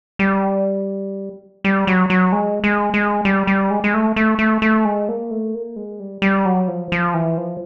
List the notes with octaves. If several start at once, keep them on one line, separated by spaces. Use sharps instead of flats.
G3
G3
F#3
F#3
G#3
G#3
G#3
G3
G3
G#3
G#3
A3
A3
A3
A3
G#3
A#3
A3
A#3
G#3
G3
G3
F#3
F3
F3
E3
F3